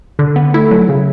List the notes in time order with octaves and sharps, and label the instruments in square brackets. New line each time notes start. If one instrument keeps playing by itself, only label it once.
[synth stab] D3
B3
[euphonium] A3 [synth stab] E4
[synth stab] F#3
C#3